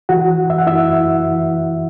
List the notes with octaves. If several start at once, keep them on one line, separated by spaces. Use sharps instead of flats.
E3 F#4 F#5
F#2 E5
F#5
E4 E5
F#2
E3